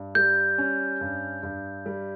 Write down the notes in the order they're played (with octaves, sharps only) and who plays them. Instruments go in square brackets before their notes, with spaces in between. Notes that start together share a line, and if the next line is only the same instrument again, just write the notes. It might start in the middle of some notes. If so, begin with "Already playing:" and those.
Already playing: [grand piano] G2
[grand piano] G3 [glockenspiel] G6
[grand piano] C#4
G2
G2
G3